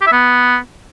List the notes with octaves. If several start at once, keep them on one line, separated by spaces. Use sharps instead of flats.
G4
E5
B3